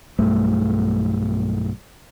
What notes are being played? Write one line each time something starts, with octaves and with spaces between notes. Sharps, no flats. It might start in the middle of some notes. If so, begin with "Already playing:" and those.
B1 G2 A3